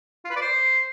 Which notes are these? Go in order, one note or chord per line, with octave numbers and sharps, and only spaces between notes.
F4
B4
D5
C5